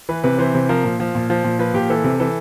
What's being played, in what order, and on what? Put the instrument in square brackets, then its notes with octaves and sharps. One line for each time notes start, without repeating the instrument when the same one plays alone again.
[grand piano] E3 B4
C3 B4
E3 C5
C3
F3 A#4
A#2
F3
A#2
F3
A#2
F3 B4
A#2 G4
E3 A4
C3
E3 A4